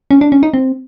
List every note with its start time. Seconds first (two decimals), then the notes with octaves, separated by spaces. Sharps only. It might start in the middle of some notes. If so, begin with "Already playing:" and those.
0.11 C#4
0.21 D4
0.32 C#4
0.43 D#4
0.54 C4